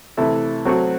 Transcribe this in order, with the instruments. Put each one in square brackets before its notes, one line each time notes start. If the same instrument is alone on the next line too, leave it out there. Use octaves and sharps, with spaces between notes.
[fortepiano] C3 E3 A3 E4 A4
F#3 A3 C4 F#4